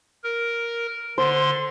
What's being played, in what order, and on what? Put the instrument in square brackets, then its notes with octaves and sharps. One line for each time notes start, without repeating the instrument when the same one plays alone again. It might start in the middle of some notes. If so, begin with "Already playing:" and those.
[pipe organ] A#4
[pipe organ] D3 C6 [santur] C5